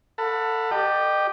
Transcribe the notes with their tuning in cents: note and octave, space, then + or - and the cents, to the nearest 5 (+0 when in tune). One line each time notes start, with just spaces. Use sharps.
A4 +25 F#5 -25 B5 +0
G4 +0 D#5 -35